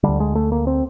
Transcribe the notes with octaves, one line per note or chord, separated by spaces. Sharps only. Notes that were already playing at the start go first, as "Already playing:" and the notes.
D2 D3 G3
G#3
A3
A#3
C4